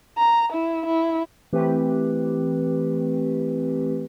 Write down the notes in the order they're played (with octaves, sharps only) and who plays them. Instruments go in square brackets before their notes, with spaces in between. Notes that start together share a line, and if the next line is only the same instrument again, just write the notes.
[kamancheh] A#5
E4
E4
[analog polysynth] E3 A3 C4 G4 B4